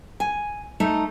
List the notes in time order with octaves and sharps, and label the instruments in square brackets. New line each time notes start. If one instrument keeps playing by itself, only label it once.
[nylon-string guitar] G#5
A3 D#4